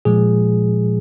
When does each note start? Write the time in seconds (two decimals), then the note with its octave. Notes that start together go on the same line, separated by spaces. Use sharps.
0.05 A#2 F3 G#3 G#4